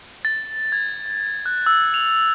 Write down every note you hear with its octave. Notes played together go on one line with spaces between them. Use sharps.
A6
G#6
F#6
E6
F7